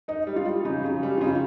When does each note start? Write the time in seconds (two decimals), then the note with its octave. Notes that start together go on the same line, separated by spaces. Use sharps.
0.08 D#4 D#5
0.27 G3
0.36 F4
0.46 G3
0.65 C#3 D#4
0.84 C#3
1.03 G3
1.18 F4
1.21 C#3 D#4